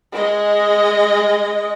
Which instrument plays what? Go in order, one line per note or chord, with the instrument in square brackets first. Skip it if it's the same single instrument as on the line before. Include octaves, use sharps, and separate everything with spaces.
[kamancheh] G#3 D#5